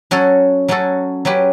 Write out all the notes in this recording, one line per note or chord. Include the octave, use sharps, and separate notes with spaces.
F#3 C#4 F#4 A4
F#3 C#4 F#4 A4
F#3 C#4 G4 B4